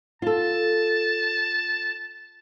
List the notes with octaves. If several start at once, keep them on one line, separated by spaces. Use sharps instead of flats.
F4 A4 A5